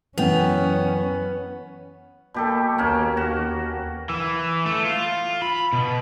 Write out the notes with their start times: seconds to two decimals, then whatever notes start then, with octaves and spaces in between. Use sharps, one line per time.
0.18 F#2 E3 B3 C#4 G5 F7
2.34 B2 A#3 G4 A4
2.78 D#2 A#3 C#4
3.17 F#4
4.09 E3
4.66 A3
4.85 F4
5.42 B5
5.73 B2